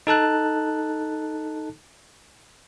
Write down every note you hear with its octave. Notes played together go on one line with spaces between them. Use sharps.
D#4 A4 A5 F#6